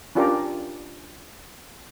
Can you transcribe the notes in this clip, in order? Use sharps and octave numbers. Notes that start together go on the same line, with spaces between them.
C#4 D4 F4 G4 A#4